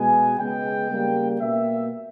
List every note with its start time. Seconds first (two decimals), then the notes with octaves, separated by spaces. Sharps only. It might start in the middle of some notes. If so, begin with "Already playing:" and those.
Already playing: B2 G#3 B3 G#5
0.39 C#3 G#3 B3 G5
0.90 C#3 G3 A#3
1.40 B2 A#3 E5